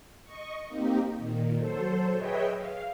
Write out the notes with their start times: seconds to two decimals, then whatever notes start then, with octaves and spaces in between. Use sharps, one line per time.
0.24 D#5 C#6
0.67 A#3 C4 D#4 G4
1.14 A#2 D#3
1.58 F#3 A4 C5
2.14 G#4 B4 C#5 D#5 E5 G5
2.57 F5